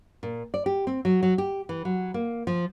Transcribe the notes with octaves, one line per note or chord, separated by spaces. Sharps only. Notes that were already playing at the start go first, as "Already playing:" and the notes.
A#2
D5
G4
C4
F#3
F#3
G4
E3
F#3
A#3
F3